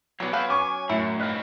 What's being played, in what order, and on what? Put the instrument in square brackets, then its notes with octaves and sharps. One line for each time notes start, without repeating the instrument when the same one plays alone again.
[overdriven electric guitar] F#3 B3 [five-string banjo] C#5 D5
[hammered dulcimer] F#3 [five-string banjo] B3 B4 F5 [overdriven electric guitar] C5 G5
[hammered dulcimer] C#4 [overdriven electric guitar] G#5 [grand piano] C#6 D6
[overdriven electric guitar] F#2 [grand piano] A2 C#7 [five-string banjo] E4
[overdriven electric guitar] G2 C4 [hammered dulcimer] D#4 B4 F5